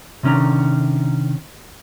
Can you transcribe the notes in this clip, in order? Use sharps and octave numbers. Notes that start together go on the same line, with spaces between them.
C3 D#3 C#4 D4 A#5